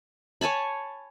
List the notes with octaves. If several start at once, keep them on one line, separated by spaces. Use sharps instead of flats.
C#5 G#5 A5 B5